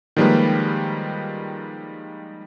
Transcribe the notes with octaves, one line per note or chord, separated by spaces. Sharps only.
D#3 F3 G3 G#3 A#3 B4